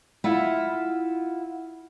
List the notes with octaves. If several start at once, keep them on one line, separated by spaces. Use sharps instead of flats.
E4 F4 F#5